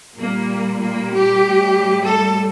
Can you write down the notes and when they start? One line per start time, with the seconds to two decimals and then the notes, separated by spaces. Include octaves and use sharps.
0.19 A#2 G3 A#3
0.81 A#3
1.13 G4
1.44 A2 G3
2.06 A4